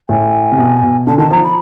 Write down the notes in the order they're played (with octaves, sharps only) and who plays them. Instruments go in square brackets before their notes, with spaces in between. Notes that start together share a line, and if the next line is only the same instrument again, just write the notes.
[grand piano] A2 [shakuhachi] G#5
[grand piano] C3
B2
B2
[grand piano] D3 [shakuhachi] A5
[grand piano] D#3 [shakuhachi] A5
[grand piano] F3 [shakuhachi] A#5
[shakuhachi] B5